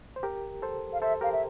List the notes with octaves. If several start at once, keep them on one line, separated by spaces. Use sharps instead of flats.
C5
G4 A#4
A4 C5
F5
A4 C5 E5
G4 A#4 F5
E5